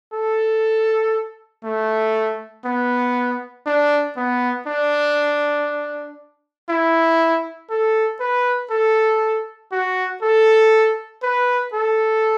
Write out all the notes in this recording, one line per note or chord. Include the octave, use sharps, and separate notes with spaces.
A4
A3
B3
D4
B3
D4
E4
A4
B4
A4
F#4
A4
B4
A4